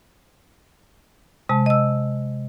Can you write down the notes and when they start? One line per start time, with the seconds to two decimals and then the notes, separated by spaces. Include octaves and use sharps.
1.49 C3 G#3 A5
1.66 D#5 E6